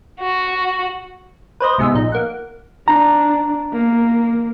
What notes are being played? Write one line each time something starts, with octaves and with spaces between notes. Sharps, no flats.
F#4
B4 C5 D#5
C2 G#2 B2 G#4 E5
A#1 D#4
A#3 F#5
D4 A#5
A#3